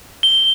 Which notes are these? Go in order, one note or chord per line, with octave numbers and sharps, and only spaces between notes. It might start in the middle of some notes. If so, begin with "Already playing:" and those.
G7